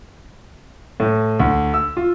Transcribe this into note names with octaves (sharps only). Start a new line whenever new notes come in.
A2
D2
E6
F4